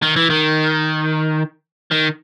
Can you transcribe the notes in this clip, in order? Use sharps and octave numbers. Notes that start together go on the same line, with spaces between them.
D#3
E3
D#3
D#3